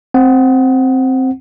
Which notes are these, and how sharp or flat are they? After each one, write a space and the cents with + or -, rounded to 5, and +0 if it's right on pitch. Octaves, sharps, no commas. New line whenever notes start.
C4 +0 F#5 +0